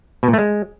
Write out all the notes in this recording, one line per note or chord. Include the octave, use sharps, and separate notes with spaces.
B2
A#2
A3
G#3